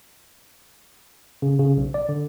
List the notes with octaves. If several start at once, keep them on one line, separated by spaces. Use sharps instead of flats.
C#3
C#3
B1
D5
D3